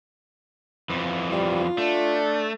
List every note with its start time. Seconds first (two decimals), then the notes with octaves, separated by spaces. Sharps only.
0.90 F2 E3
1.32 G3 F4
1.78 A3 D4